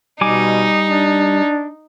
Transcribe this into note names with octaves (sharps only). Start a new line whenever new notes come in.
B2 G3 D#4 G#5 D6
D4